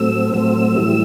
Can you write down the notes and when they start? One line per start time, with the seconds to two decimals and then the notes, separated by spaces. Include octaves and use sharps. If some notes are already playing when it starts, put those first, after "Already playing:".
Already playing: A2 F#3 A3 C4 E6
0.34 A2 F#3 A3 C4 E6
0.77 A2 E3 G3